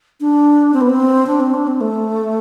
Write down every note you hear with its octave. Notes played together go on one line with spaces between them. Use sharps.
D4
C4
B3
C4
D4
C4
D4
C4
A3